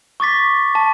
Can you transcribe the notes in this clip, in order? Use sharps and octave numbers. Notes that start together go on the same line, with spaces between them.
C#6 D6 A6 B6
A5